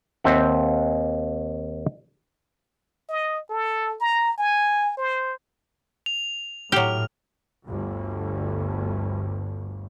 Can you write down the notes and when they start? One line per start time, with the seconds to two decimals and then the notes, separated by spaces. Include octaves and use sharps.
0.24 D#2 C4 E5 F#5
3.09 D#5
3.50 A4
4.00 A#5
4.38 G#5
4.97 C5
6.06 F7
6.72 A2 F#3 G4 F6 F7
7.66 G1 D2 G2